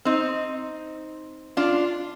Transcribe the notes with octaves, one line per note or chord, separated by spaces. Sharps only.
C4 D#4
D4 F4